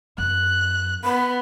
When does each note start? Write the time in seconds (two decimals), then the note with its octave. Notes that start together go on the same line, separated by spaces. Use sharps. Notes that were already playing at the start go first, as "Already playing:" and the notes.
0.18 F#2 F#6
1.04 B3 B5